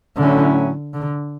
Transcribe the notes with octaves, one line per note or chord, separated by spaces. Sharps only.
A2 D3 F#3 A3 C#4 E4
D3